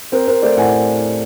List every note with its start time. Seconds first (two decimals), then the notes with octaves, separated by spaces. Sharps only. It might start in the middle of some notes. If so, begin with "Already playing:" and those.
0.12 C4 A#4 C5
0.27 C4 A#4 C5
0.42 A3 C5 D5
0.57 A2 F#5 G#5